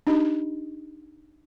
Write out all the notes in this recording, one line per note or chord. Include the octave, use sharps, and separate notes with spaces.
D4 D#4 G4 D#5